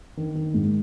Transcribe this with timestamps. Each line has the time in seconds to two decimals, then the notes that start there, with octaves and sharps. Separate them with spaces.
0.17 D#3
0.35 D#3
0.54 G#2